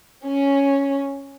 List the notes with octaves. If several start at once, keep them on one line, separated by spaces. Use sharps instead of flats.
C#4